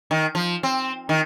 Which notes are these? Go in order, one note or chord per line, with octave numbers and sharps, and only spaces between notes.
D#3
F3
C4
D#3